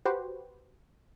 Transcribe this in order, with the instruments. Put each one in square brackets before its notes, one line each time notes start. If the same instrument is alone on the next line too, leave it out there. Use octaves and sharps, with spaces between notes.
[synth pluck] F#4 G4 B4 C5